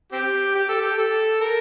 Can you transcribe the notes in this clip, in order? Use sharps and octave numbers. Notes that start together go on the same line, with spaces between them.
C4 G4
G4
A4
G4
A4
A#4